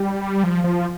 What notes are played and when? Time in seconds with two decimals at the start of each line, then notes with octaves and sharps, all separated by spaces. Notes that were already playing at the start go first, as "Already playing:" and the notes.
Already playing: G3
0.44 F3
0.64 F3